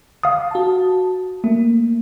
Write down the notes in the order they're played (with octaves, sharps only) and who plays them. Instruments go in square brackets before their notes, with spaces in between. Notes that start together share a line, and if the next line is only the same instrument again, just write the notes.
[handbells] F5 D#6
[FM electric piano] F#4 A5
[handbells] A3 [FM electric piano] A#3